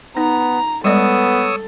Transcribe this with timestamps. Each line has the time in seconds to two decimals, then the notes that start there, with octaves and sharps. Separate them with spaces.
0.17 B3 D#4 A#5
0.84 G3 G#3 B3 A4 C#5 D5 D#6 E6